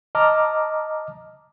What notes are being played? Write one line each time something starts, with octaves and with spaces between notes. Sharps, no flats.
D#5 A5 A#5 D6 F6